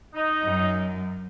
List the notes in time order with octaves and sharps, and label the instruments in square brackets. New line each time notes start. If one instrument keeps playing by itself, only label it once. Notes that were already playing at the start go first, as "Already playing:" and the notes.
[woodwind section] D#4
[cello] F#2